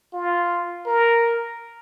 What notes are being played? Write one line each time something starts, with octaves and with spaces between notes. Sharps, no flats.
F4
A#4